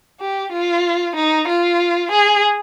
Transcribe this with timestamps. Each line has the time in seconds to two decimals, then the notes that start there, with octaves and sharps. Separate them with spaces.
0.20 G4
0.52 F4
1.16 D#4
1.48 F4
2.12 G#4